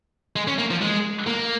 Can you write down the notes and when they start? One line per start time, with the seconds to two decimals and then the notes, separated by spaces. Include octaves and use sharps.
0.36 G#3
0.47 C#4
0.58 A#3
0.71 F3
0.82 G#3
1.27 A#3